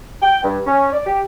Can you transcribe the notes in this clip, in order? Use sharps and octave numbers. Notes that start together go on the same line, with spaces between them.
G5
G2
C#4
D5
G4